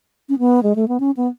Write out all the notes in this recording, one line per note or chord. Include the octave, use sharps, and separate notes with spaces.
C#4
B3
G#3
A3
B3
C#4
B3